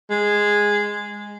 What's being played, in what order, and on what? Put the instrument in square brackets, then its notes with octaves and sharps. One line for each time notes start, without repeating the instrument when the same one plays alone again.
[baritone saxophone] G#3